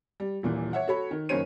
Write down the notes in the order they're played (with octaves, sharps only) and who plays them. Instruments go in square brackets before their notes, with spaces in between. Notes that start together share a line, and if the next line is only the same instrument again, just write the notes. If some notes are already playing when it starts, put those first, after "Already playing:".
[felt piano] G3
D#1 A#2 E3
C#5 E5 F#5
F#4 A4 C#5 B5
D#3
F#1 D#3 C#4 C5 C#5 D#7